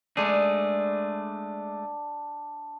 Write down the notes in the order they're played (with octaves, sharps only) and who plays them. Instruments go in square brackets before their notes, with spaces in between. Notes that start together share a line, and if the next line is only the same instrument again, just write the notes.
[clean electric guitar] G#3 A3 G#4 [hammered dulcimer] D4